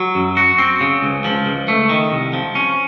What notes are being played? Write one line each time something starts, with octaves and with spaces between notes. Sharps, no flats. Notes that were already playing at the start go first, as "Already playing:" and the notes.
Already playing: F#3
F#2
F#4
C4
C#3
C#2
F3
C#2
A3
D#3
C2
F3
C#4